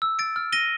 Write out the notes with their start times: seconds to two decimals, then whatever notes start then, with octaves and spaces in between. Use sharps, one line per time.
0.02 E6
0.19 A6 D7
0.36 F6
0.52 A#6 D#7 G7